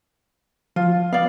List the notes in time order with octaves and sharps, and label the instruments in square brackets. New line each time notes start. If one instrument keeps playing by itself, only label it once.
[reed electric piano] F3 [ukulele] F4
[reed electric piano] B3 [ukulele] D5 F5